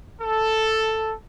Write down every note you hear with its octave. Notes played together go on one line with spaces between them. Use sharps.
A4